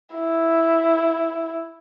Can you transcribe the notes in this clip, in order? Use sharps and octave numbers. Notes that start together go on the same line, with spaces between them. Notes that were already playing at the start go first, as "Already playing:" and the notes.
E4